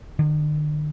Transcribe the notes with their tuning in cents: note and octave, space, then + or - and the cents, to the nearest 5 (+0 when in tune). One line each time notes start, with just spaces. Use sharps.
D3 +45